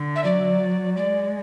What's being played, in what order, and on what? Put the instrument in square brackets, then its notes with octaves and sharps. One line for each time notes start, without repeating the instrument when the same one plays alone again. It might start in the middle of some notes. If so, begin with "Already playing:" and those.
Already playing: [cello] D3
[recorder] E5
[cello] F#3 [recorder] D5
[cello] G#3 [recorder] D5